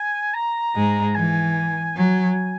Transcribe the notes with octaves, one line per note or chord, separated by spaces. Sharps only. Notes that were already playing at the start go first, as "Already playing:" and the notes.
Already playing: G#5
A#5
G#2 G#3
E3 G#5
F#3 G#5